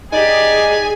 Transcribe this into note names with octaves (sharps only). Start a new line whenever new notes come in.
D#4 G4 G#4 D5 G#5